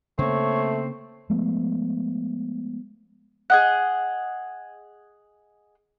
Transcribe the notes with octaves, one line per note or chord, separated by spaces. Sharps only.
C#3 A3 A#3 C4 C#5
F3 G#3 A3 B3
G#4 D#5 F#5